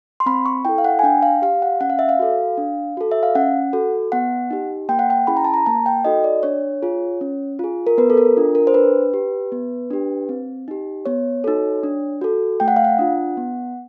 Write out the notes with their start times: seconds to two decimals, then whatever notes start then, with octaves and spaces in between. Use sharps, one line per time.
0.20 C6
0.26 C4 B5
0.46 C#6
0.65 E4 A4 G5
0.78 F5
0.84 F#5
0.99 G#5
1.03 D4 G5
1.22 F5
1.42 G4 F5
1.62 F#5
1.80 C#4 F#5
1.90 F5
1.99 E5
2.09 F5
2.19 F#4 A4
2.57 D4
2.97 F#4 A4
3.12 E5
3.23 F5
3.35 C#4 F#5
3.73 F#4 A4
4.12 B3 F#5
4.51 D#4 G4
4.89 A#3 G5
4.99 F#5
5.10 G5
5.27 C#4 E4 G#4 B5
5.37 A#5
5.45 A5
5.54 A#5
5.66 A#3 A5
5.86 G5
6.05 D#4 F#4 A4 D#5
6.24 D5
6.43 D4 C#5
6.82 F4 G#4
7.21 C#4
7.59 F4 G#4
7.87 A#4
7.98 B3 B4
8.10 A4
8.17 A#4
8.37 D4 F4
8.55 A#4
8.67 C5
8.74 D4 B4
9.14 G4
9.52 B3
9.91 D4 G4
10.29 C4
10.68 D#4 G4
11.05 B3 C#5
11.44 D#4 F#4 A4
11.83 D4
12.21 F#4 A4
12.60 A3 G5
12.68 F#5
12.76 F5
12.84 F#5
12.99 D4 F4
13.37 B3